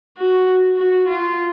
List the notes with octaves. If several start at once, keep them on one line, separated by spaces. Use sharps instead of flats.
F#4
F#4
F4